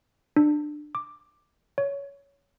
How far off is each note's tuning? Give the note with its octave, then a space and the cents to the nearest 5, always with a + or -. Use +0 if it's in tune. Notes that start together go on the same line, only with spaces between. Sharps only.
D4 +20
D6 +10
C#5 +15